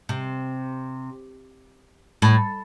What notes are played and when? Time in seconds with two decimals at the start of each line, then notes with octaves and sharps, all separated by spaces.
0.09 C3
2.22 A2